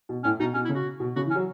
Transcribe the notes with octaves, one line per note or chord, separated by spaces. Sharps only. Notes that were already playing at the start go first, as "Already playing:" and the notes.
B2
A2 C#4
B2 D#4
B2 C#4
E4
C#3
F#4
B2
C#3 F#4
E3
C#4
F#3